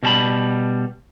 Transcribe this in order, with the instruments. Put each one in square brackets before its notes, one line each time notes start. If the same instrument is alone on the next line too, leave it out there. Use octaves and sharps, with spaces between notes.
[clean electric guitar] B2 G3 A#4 A5 B5